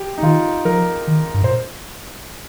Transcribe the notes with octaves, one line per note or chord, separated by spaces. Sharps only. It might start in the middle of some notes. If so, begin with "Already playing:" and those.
Already playing: G4
D#4
D#3 F4
F3 A#4
D#3
G2
A#2 C5